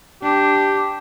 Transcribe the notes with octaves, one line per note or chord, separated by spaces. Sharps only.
D4 G4